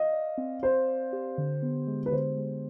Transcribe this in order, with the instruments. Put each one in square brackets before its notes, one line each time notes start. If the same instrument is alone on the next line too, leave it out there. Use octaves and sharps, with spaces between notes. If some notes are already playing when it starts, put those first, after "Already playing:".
Already playing: [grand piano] D#5 [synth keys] F5
[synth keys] D5
C4
[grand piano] C5 [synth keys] D5
[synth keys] D5
G4
D3
B3
G#3
[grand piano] B4
[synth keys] D3 [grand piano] C5
[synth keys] G#3